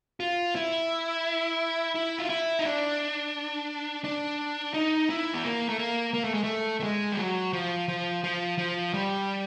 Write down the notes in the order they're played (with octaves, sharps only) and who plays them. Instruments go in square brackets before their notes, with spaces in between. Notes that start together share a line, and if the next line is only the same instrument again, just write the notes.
[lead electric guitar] F4
E4
E4
F4
E4
D#4
D4
D4
D#4
E4
B3
A#3
A3
A#3
A#3
A3
G#3
A3
A3
G#3
G3
F#3
F3
F3
F3
F3
G3